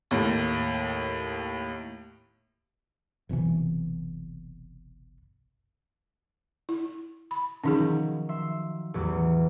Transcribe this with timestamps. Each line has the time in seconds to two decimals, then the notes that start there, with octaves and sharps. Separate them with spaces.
0.11 D#2 A2
3.29 F#1 C2 B2 E3
6.69 E4
7.31 B5
7.64 D#3 F3 F#3 C#4 D#4 G#4
8.29 E5 C6
8.94 A1 E2 F#3